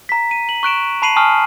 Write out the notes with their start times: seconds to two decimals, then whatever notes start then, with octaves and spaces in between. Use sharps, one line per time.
0.09 A#5 B6
0.31 D#7
0.49 F#7
0.63 C#6 F#6 D7 E7
1.02 A5 B5 C7 D#7 F#7
1.16 G#5 A5 C#6 D#6 F6